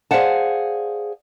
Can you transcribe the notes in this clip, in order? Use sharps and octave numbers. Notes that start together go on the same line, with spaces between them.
G#4 C5 D5 F5 F#5 A5